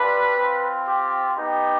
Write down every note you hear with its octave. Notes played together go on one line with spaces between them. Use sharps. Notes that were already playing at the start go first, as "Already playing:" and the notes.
Already playing: G3 D4 F4 B4
C4 F4
G4
B3 D#4 G4